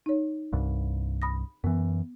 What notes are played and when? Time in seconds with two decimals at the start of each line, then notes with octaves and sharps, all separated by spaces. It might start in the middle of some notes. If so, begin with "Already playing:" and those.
0.06 D#4 C#5
0.53 C2 G2
1.22 B5 D#6 A#6
1.64 F#2 E3 B3